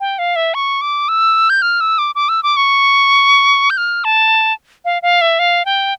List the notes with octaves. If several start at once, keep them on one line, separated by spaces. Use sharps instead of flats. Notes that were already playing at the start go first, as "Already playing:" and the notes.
G5
F5
E5
C#6
D6
E6
G6
F6
E6
D6
D6
E6
D6
C#6
G6
F6
A5
F5
F5
E5
F5
G5